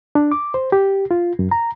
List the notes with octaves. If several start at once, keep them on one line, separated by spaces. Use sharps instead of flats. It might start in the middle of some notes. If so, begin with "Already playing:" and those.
D4
D6
C5
G4
F4
F#2
A#5